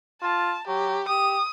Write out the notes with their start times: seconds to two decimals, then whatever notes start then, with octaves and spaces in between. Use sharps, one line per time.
0.22 F4 A5
0.68 F#3 G4
1.08 G4 D#6